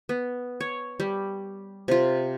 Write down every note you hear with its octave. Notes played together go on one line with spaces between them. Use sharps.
B3
C#5
G3
C3 F4